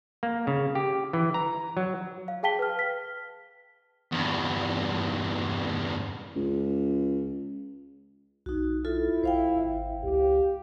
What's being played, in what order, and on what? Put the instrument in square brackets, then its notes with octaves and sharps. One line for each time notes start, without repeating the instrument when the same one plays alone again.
[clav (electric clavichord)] A#3
C#3
G4
E3
A#5
F#3
[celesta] F5
G#4 F5 G5 A5 B6 G7
B4 F6
B6
[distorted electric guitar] E2 G2
[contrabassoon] C#2
[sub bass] B1 [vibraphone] D#4 F#4
[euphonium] E4 [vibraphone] F4 A4
[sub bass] A#1 [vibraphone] C5 F5 G5
[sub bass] G#1
[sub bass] C#2 [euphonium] G4